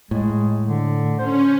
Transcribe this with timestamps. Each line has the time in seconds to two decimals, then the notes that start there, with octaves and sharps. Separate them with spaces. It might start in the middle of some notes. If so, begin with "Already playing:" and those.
0.11 A2 G#3
0.68 D3
1.19 C#4 C5